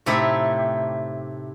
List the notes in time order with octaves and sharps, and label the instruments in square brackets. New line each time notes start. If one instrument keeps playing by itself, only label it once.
[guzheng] A2 C3 A3 D#4 E4 G4